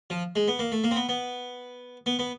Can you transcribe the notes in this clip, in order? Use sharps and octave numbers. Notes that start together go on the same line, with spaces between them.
F3
G#3
B3
A#3
A3
A#3
C4
B3
B3
B3
B3